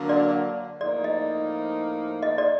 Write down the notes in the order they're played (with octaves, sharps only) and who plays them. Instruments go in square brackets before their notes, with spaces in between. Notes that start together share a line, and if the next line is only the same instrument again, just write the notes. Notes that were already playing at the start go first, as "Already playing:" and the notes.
Already playing: [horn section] D3 F#3 A#3
[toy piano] D5
[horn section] A2 F3 A#3 D#4 [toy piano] D5
[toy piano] D#5
D#5
D5